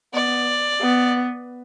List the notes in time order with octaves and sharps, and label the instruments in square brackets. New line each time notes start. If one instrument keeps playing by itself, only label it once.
[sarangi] B3 [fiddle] D5
[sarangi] B3